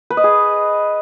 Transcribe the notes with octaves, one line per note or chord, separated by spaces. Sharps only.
B4
D#5
G#4